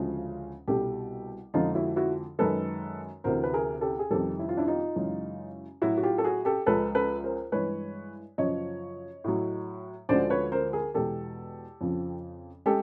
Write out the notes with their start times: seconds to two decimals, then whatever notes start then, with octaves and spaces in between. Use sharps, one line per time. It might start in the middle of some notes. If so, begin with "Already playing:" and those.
Already playing: D2 C#3 F3 G#3
0.67 C2 B2 G3 G4 A4
1.54 F2 D3 F3 G#3 D#4 F4
1.75 E4 F#4
1.96 E4 F#4
2.39 F#2 D#3 G#3 A4 B4
3.24 D2 C3 E3 A#4 C5
3.44 B4
3.54 G#4 A#4
3.81 G4 A4
3.99 G#4
4.10 F2 C3 D#3 G3 G4 A4
4.39 E4
4.49 F4
4.57 D4 E4
4.67 D#4 F4
4.96 F#2 C#3 E3 G#3
5.82 A2 F#3 E4 F#4
5.98 F#4
6.03 F4 G4
6.18 A4
6.24 F#4 G#4
6.45 G4 A4
6.66 C#2 C#3 F3 G#3 A4 B4
6.95 A4 B4
7.24 A#4 C5
7.52 G2 E3 G#3 B4 C#5
8.38 F#2 C#3 F3 C#5 D#5
9.24 A2 F#3
10.09 D2 D3 F3 G#3 C5 D5
10.30 B4 C#5
10.52 A#4 C5
10.73 G#4 A#4
10.94 E2 B2 G#3 G4 A4
11.81 F2 C#3 F3
12.66 G#3 G4 A4